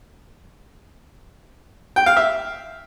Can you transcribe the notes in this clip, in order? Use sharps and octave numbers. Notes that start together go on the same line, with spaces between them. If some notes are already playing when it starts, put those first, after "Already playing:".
G5
F5
E5